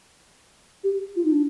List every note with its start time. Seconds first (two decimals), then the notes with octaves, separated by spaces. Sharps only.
0.84 G4
1.16 F4
1.25 D#4
1.32 D4